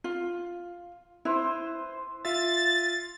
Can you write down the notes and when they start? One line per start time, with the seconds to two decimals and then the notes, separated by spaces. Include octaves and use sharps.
0.04 F4
1.25 E4 B4 C5
2.25 F4 E5 A6